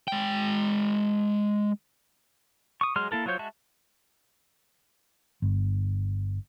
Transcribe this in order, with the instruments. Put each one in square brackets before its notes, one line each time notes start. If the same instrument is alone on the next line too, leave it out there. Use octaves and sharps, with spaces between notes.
[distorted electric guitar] G#3 G5
[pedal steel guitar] C#6 D#6
F#3 G#3 G#4 C6 F6
A#3 E4 A4 A#4
F#3 F4 C5 C#5 G6
G#3 F#4 E5 A5
[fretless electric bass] G1